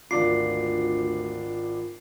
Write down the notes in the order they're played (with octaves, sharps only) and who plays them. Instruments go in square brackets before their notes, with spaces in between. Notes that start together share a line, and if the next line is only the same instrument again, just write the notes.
[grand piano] G#1 D4 D6 [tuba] D2 [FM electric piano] F4 [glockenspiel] C7